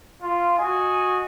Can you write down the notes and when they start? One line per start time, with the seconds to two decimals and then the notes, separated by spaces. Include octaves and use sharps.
0.22 F4
0.58 F#4 D#5 G#5